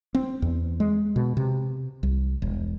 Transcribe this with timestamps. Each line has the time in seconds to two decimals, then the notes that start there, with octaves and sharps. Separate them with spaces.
0.15 C4
0.42 E2
0.80 G#3
1.16 B2
1.37 C3
2.03 C2
2.42 E1